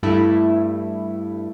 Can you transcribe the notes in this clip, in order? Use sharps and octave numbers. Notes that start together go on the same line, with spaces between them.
G2 A3 E4